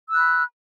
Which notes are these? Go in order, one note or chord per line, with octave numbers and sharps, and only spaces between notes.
B5 E6 F#6